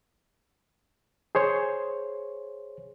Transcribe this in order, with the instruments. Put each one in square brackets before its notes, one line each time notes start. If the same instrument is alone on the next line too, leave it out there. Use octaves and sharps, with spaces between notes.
[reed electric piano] G#4 C5 C#5